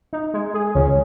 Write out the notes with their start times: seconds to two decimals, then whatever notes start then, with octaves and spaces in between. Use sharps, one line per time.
0.13 D#4
0.34 G#3
0.54 G#4
0.75 C#2 C#4